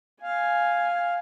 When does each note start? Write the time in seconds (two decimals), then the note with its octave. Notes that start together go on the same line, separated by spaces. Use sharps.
0.23 F5 G#5